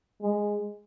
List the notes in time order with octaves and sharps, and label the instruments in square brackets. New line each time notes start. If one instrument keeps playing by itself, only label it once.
[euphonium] G#3